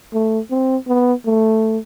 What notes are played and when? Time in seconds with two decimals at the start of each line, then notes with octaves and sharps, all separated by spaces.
0.13 A3
0.51 C4
0.88 B3
1.26 A3